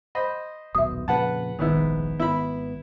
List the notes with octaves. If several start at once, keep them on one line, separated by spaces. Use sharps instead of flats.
C5 D#5 B5
D#1 B1 B2 E5 D#6
F2 A#2 C#3 B4 F#5 A5
F1 A#1 G#2 D#3 B3 E4
G#1 B3 E4 B5